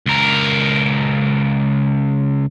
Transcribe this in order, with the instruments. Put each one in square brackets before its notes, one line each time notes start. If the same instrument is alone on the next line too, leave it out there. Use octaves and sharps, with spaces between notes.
[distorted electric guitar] C#2 A#4